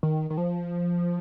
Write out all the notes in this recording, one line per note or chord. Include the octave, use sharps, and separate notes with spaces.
D#3
D#3
F3